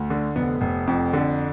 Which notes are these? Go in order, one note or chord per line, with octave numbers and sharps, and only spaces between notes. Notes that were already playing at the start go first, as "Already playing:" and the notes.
Already playing: D2
D3
F1 B3
F1
F2
D3